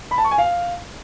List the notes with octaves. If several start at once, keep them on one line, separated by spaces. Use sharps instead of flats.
B5
A5
C#6
G#5
F5